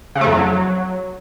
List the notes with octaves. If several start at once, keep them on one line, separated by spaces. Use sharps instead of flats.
C#3
A3
F2
F#3